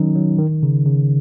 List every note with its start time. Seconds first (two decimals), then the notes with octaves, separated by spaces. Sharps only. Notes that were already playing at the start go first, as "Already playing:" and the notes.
Already playing: D#3 F#3 C#4 D#4
0.15 F#3
0.39 D#3
0.63 C#3
0.86 C#3